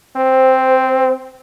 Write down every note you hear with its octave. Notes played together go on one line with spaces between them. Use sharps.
C4 C5